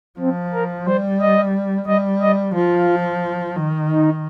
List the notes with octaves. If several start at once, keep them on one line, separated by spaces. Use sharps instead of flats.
F3 C4
A#4
G3 C5
D#5
G3 D#5
D#5
F3 F4
D#3
D#4